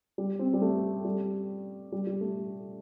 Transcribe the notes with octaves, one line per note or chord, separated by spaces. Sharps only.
G3
C4
G3
A3
G3
G3
G3
A3